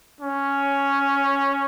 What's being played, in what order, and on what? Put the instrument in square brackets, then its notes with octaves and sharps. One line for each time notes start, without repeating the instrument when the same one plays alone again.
[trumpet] C#4